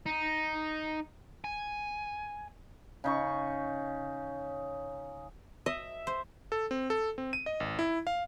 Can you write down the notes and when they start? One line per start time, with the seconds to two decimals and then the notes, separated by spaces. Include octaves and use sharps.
0.06 D#4
1.44 G#5
3.04 C#3 D#4 C#6
5.66 D#5 E5
6.07 C5
6.52 A4
6.71 C4
6.90 A4
7.18 C4
7.33 D#7
7.46 D#5
7.60 G#1
7.79 E4
8.07 F5